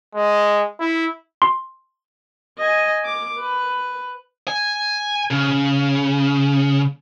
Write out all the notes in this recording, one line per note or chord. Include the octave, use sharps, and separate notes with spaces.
G#3
E4
C6
D#5 G#5
D6
B4
G#5
C#3